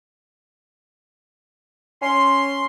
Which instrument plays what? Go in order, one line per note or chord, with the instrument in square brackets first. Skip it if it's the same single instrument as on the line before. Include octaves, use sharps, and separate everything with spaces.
[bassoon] C#4 [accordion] C6